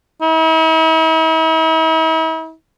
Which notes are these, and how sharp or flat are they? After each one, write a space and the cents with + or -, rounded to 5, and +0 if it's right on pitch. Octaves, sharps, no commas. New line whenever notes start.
E4 -45